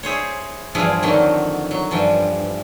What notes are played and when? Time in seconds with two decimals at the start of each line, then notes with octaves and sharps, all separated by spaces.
0.03 E4 G#4 C5 C#5
0.75 E2 G2 F3 E4 G#4 D5
1.02 F2 D3 D#3 F#3 A3 G5
1.71 F#3
1.91 G2 E3 F3